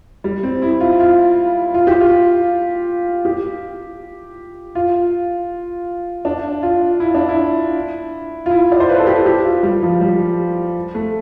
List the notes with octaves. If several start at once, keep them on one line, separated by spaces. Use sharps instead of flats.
G3
C4
E4
F4
F4
F4
G4
F4
G4
F4
D4
F4
E4
D4
E4
F4
E4
D5
C5
B4
A4
G4
G4
F4
G3
F3
G3
A3